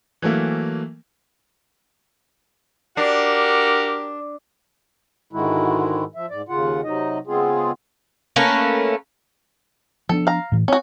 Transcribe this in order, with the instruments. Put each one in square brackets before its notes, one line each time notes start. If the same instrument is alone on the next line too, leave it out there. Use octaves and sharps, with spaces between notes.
[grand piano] E3 F#3 A3 A#3
[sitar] D4 [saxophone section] F#4 G4 A#4
[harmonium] G#2 D3 D#3 G#3 E4 F#4
F3 E5
G#2 D5
D#2 C#3 F4 F#5
C3 F#3 D#4 D#5
C#3 G#3 B3 C4 F4 G#4
[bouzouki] A3 A#3 C#4 B4
[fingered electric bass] F3 B3 D4 [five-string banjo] A4
[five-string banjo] F5 A#5
[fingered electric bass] A2 E3
[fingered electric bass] C4 [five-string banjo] C#4 F#4